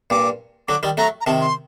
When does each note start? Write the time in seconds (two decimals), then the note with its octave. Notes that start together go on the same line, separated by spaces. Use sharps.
0.10 G2 A#2 D6
0.68 D3 F#3 D6
0.83 D#3 G3
0.97 F#3 A3 A#5
1.21 A#5
1.26 C3 D#3 A5
1.40 C6